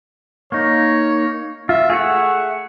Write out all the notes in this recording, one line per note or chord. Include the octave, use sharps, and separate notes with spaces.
A#3 D#4 C#5
F4 E5
A3 G#4 E5 F#5